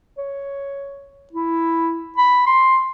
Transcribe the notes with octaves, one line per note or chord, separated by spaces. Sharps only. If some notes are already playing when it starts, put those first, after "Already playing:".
C#5
E4
B5
C6